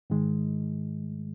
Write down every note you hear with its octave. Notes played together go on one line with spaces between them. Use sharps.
G#2 D#3 G#3